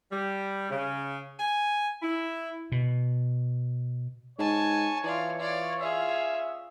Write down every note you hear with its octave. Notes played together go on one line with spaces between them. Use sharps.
G3
C#3
G#5
E4
B2
G#2 C#5 G#5 A5
E3 F4 D5
F4 D5
C#4 F4 G#4 D#5 E5